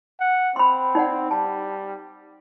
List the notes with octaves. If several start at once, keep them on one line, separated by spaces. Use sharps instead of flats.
F#5
C4 B5 C6
D#4 D5 F#5
G3 A5